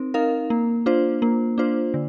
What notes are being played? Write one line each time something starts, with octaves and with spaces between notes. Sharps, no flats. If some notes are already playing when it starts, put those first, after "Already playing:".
Already playing: C4 D#4 A#4
D#4 A#4 F5
A#3
D4 F4 C5
A#3
D4 F4 C5
D3